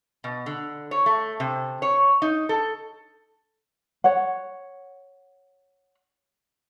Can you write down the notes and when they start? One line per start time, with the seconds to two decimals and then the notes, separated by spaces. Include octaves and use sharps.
0.24 B2
0.46 D3
0.91 C#5
1.06 A3
1.40 C3
1.82 C#5
2.22 D#4
2.49 A4
4.04 C#5 F#5